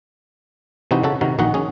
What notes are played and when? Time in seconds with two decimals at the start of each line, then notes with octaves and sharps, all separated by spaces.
0.91 C3 E3 C4 D#4 F#4 B4
1.04 C#3 F#4 A4
1.21 C3 D#3 F#4 A#4
1.39 A#1 D#3 D#4 F#4 F#5
1.54 C#4 G#4